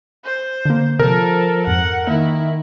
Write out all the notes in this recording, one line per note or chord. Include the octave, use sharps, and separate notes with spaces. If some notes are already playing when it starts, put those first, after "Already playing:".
C5
D3 A#3
C3 F3 A4 A#4
F2 G#2 F#5
D#3 A#3 E4